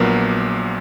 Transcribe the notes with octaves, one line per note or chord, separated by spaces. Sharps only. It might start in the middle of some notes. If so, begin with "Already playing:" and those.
Already playing: A#1 A#2 F#3 B3 A#4